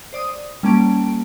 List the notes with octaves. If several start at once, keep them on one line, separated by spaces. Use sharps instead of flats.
C5 D5 D#6
G3 A#3 C#4 A5 D7